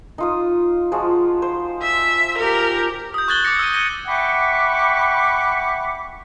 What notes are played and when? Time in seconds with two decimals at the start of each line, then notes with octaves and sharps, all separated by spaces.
0.18 D#4 F4 D#6
0.92 F3 G#3 F#4
1.42 C5
1.82 E5
2.38 G4 A#4
3.14 D#6 G6
3.28 C#6 F#6 G#6 A6 F#7 G7
3.45 D6 A6 A#6 C#7
3.59 E6 D#7
3.73 G6 A#6 D#7 G7
4.07 E5 F#5 G5 B5 C#6 D6